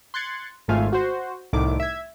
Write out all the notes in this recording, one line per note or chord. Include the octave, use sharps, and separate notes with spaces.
C6 F#6 G#6 A6 C#7
G#1 G#2 A3 F4 F5 G#5
F#4 C5
C2 A2 D#3 D6
E5 G#6